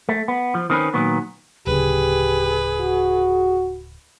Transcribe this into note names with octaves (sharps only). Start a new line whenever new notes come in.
A3
B3
F3
D#3 C4 C#4 B4
A#2 D#3 F#3 B3
D1 C#3 G4 G#4 B4
F#4